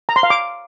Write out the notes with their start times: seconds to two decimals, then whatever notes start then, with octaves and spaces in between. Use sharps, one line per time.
0.09 A#5
0.16 C6
0.23 F5
0.30 D6